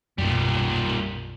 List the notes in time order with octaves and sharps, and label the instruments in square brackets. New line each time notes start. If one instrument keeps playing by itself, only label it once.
[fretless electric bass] B1 F#2 [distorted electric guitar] A#2 G3